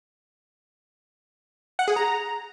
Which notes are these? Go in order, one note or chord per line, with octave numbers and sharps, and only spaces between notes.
F#5
G#4
A#5